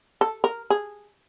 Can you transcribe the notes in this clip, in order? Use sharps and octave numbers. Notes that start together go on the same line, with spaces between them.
A4
A#4
G#4